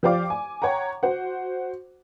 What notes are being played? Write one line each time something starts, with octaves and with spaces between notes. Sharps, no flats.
F3 G4 C5 D5 F5 D6
G#5
C#5 F#5 G5 A#5
F#4 C5 F#5